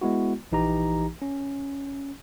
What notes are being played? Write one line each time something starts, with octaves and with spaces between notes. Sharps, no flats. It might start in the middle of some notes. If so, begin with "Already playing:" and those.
G#3 B3 E4 F#4
A#1 E3 D#4 G4 A#5
C#4